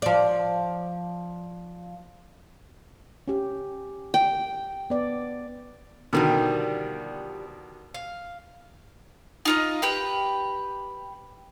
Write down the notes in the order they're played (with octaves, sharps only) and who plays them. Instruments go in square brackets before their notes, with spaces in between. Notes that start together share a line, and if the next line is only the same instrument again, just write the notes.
[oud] F3 D5
[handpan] C#4 G4
[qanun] G5
[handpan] B3 D5
[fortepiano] B2 D3 D#3 [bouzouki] F3 G3 B3
[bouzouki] F5
[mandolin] D#4 F4 D#5
G4 B4 G5